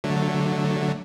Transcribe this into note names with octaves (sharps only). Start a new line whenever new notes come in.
D3 F#3 A3